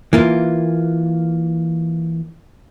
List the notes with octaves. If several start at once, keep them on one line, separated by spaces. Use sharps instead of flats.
E3 A#3 F4